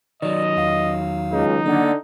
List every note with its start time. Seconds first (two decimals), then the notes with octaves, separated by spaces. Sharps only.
0.22 D#3 F#3 D5 D#5
0.57 E2 F5
1.32 C#2 D#4
1.66 D3 A#3 F#5